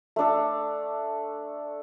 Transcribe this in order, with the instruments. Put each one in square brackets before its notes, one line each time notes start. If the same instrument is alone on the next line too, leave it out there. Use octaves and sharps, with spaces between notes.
[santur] A3 D4 A4